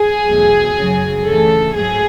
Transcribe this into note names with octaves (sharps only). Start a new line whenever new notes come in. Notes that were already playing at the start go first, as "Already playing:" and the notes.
Already playing: G#4
E2 B2 F#3 A3
F#2 C#3 F#3
D2 C#3 E3 A3 A4
G#2 F#3 A3 G#4